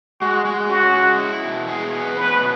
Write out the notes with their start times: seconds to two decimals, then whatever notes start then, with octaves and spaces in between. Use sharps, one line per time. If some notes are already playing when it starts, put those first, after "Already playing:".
0.21 G#3 F#4
0.45 G#3
0.69 C#4 F#4
0.94 G#3
1.18 E4
1.44 B2
1.68 G#4
1.93 B3
2.17 C#4 B4
2.40 B2